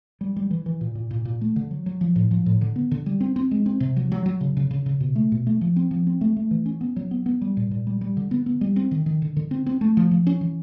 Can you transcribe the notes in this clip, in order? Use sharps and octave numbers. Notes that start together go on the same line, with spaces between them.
G3
G3
E3
E3
A#2
A#2
A#2
A#2
A3
D3
F#3
F#3
F3
A2
F3
A2
D3
B3
D3
G3
C4
C4
G#3
C4
C3
F#3
F#3
F#3
C#3
C#3
C#3
C#3
B2
A3
B2
A3
F3
C4
F3
C4
A3
A3
E3
C#4
B3
F#3
B3
B3
G3
A#2
A#2
G3
G3
D3
B3
B3
G3
C4
D#3
D#3
D3
D3
C4
C4
A3
F3
F3
C#4
E3